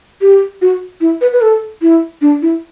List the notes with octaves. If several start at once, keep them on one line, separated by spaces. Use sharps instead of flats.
G4
F#4
E4
B4
B4
A4
E4
D4
E4